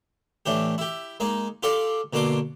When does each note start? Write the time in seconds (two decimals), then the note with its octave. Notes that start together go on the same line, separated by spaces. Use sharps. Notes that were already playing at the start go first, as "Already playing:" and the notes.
0.46 A2 E3 D4 G4
0.78 E4 G4
1.20 G#3 A#3 D#4
1.63 F4 G4 A4 D5 F5
2.13 B2 D3 A#3 D4 C6 D6